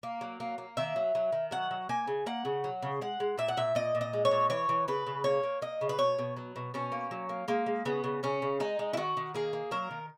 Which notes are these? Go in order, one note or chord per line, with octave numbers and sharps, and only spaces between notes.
A#3
F#3
A#3
A#3
D#3 E5
F#3
F#3
D#3
F#3 F#5
F#3
A#3 G#5
C#3
A#3 F#5
C#3
F#3
C#3
G#3 F#5
G#3
A#2 E5
F#5
A#2 E5
A#2 D#5
A#2
D#5
G#3
C#5
A#2
E3 C#5
E3
C#3 B4
C#3
A#3 C#5
A#3
A#3 D#5
C#3
B4
B2 C#5
B2
F#3
B2
B2 C#4
A#3
F#3
A#3
G#3 A#3
G#3
C#3 B3
C#3
C#3 C#4
C#3
G#3 D#4
G#3
E4
D#3 F#4
D#3
A#3 G#4
A#3
F#3 A#4
D#3